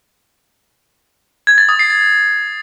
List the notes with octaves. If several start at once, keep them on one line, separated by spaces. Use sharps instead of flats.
G#6
A6
D#6
C7
A6